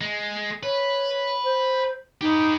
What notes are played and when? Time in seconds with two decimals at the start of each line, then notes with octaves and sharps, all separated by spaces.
0.01 G#3
0.63 B4 C#5
1.44 C5
2.21 D#4 G4 B4